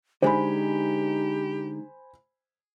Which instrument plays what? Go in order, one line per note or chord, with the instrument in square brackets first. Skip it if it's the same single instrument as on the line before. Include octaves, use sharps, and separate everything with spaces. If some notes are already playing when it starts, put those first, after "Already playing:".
[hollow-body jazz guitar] D3 G#3 [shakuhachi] D#4 [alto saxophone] G4 [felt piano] C5 G#5 B5